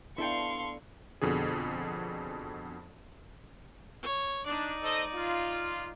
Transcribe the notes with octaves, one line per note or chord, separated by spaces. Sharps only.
B3 D4 E4 A4 F5 G5 C6 C#6
F2 B2 D3 G#4
C#5
D4 D#4 D5
A4 C5 D#5
F4